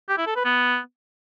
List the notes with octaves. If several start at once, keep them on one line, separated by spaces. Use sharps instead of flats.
G4
E4
A4
B4
B3